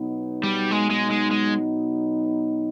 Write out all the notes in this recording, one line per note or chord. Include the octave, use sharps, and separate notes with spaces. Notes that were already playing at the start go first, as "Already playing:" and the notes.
Already playing: B2 F#3 B3 D#4
G3
G#3
G#3
G#3
G#3